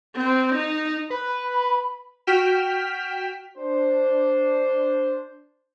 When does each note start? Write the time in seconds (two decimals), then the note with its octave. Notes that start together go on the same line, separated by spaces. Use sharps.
0.16 C4
0.55 D#4
1.10 B4 B5
2.27 F#4 G5 F6 B6 E7
3.58 D4 C5